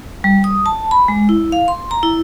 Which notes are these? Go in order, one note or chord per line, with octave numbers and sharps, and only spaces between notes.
G3
D#6
A5
B5
G#3
E4
F5
C6
A#5
E4